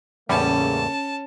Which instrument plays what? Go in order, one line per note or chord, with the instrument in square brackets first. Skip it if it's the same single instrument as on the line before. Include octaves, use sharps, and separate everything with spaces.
[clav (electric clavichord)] E2 A2 G3 [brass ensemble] C#3 A3 A#3 [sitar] C#4 [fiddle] A5